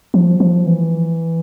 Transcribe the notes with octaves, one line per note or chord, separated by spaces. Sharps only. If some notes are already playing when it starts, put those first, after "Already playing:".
F3
F3
E3